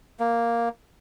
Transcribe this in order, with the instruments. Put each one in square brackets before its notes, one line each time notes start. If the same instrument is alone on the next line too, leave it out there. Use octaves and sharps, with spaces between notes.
[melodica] A#3